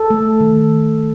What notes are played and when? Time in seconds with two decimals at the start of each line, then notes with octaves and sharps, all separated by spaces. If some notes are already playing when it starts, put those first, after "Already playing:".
Already playing: A4
0.10 A3
0.40 D#3